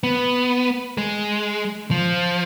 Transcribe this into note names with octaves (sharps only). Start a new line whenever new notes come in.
B3
G#3
F3